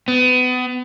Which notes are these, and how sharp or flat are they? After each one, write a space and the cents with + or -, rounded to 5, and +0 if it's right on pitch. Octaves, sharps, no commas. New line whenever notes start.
B3 +30